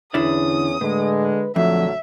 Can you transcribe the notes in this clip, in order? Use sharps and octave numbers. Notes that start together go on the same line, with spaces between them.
E2 D3 C#4 E4 D5 D#6
A2 D3 G#3 B4
A#1 F2 D3 F#3 A3 E5